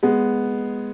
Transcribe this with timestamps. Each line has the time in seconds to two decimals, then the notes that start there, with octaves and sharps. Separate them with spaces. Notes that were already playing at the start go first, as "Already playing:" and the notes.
0.03 G#3 B3